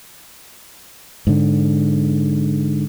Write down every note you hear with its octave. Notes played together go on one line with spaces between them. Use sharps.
G#2 D3